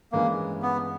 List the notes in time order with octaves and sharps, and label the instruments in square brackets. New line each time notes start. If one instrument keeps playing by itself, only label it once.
[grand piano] G2 E3 G#3 C#4 [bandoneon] A#3
[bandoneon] B3